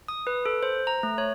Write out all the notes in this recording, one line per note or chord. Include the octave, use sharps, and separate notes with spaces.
D#6
B4
A4
C5
A#5
A3
C#5